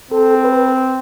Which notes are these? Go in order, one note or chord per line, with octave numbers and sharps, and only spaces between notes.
C4 A4
B4